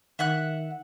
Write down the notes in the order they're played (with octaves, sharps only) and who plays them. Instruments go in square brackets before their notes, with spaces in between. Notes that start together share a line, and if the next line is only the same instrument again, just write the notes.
[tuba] D#3 [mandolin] E5 F#5 F#6